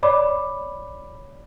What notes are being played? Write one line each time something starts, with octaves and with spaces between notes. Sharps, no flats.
C#5 D5 B5 D6